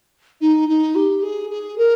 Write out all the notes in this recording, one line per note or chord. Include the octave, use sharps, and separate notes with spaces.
D#4
D#4
G4
G#4
G#4
A#4